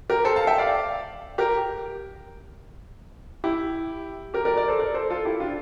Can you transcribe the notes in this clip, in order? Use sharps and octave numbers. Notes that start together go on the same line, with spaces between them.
G4 A#4
A4 C5
F5 A5
E5 G5
D5 F5
G4 A#4
E4 G4
G4 A#4
A#4 D5
A#4 D5
A4 C5
A#4 D5
A4 C5
F4 A4
E4 G4
D4 F4